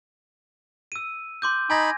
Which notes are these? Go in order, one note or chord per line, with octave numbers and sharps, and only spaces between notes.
E6 D#7
C6 D6 G6
D#4 G#5 B5 G#6 A#6